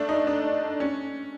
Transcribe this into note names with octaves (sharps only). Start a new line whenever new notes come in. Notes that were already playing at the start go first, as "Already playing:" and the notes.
Already playing: A3 D4
D#4
D4
C#4